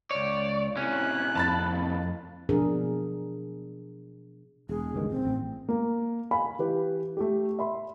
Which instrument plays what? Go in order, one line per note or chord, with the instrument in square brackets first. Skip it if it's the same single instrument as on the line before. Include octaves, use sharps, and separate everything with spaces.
[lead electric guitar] C#2 C#5 [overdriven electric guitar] D5
[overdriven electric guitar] A2 C3 [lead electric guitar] C#4 [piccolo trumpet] F#6
[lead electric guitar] F2 [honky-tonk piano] A5 B5 A6
[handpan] B2 F3 D4 G#4 A#4
[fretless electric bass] E1 [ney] G#4
[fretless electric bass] C#2 G2 D#3
[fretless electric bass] A1 [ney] C4
[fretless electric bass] A1
[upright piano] A#3
F5 G#5 B5
E3 G4 B4
A3 G4
E5 B5 C6